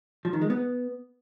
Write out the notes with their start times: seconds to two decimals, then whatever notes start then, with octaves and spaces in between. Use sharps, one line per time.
0.25 F3
0.33 D#3
0.42 G#3
0.50 B3